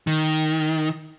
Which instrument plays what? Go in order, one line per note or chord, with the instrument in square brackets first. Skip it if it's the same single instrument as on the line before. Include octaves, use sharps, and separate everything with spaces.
[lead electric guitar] D#3